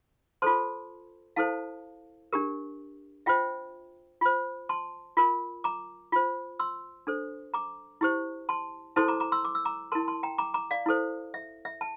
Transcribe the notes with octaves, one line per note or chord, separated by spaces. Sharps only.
F4 A4 C5 A5 C6
E4 A4 C5 F5 A5
D4 G4 A#4
F4 C5 E5 G5
F4 C5
A5 C6
F4 A#4
A#5 D6
F4 C5
C6 E6
D4 A4 C5
A#5 D6
E4 G4 C5
A5 C6
E4 A4 C5 A5 C6
A#5 D6
A#5 D6
C6 E6
D6
E6
A#5 D6
E4 A#4 A5 C6
A5 C6
G5 A#5
A#5 D6
A#5 D6
D5 F5
E4 A4 C5
E5
E5
A5